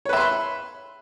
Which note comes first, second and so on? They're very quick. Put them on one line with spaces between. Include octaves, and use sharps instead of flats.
C#5 B4 E5 C6 B5